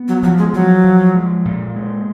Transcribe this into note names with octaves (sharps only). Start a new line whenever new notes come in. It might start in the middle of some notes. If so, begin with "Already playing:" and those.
Already playing: B3
F#3
F3 F#3
G#3
F3 F#3
F3
G#3
A#2
G#3